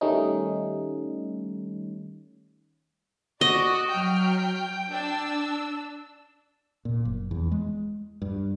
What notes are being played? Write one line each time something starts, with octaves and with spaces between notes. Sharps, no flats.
D#3 G3 A3 C#4 D#4
F#4 D5 D#5
F#3 G5 F6
D4 E6
A#2
F#1
E2
G#3
G2